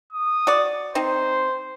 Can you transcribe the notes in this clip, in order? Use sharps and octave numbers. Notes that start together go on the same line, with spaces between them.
D#6
F#4 D5
C4 D#4 C5